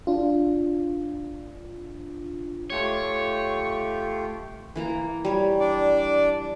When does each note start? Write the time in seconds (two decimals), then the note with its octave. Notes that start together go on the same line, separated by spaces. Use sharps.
0.07 D4 F4
2.70 A3 F4 G4 C#5
4.76 E3 A#3 A#5
5.25 G3 C#5
5.60 D4 D5